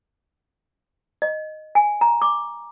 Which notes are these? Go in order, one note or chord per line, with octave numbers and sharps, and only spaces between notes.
D#5
G#5
A#5
D6